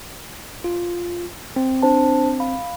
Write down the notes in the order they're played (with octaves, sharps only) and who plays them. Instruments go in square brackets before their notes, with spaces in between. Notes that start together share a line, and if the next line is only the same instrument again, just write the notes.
[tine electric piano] F4
C4
[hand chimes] D4 C5 A5
F5 B5